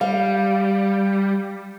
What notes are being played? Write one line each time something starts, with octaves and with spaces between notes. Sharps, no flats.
G3 F5